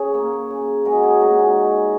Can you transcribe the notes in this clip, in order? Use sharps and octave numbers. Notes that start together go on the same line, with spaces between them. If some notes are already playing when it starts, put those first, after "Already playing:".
Already playing: C#3 G#4 C#5
A#3
C#3
G#3 F#4 A#4
G#4 C#5
A#2 F#4 A#4
D#4 G#4
G#3